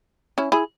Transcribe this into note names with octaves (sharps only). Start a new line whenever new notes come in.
C#4 E4
E4 G#4